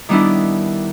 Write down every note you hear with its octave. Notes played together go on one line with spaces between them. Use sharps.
D#3 G3 B3 D4 E4